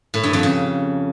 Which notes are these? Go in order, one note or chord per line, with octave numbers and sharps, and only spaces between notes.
A2
G2
F2
C#3